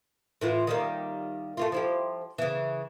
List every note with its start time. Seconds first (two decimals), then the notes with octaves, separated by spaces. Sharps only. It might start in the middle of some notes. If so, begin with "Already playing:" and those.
0.41 A2 E3 F4
0.67 D#3 G3 A#3
1.57 A3 A#3 F4
1.72 F3 E4 G4
2.38 C#3 E3